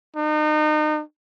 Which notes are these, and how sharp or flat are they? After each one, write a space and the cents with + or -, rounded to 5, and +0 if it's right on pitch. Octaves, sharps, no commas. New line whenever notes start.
D#4 -35